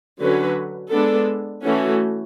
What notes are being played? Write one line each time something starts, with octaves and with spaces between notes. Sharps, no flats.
D3 F#3 C#4 F#4 B4
G#3 B3 D4 A4
E3 A3 C#4 F#4 A4